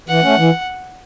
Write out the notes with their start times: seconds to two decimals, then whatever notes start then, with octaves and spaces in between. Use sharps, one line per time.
0.08 E3 F#5
0.23 A3 C#4
0.38 E3